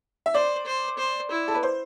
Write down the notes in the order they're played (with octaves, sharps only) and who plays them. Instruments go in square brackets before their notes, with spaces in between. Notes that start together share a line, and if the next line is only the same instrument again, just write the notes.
[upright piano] E5
[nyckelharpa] C5 [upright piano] D5
[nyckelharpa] C5
C5
E4
[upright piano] A4
B4
C5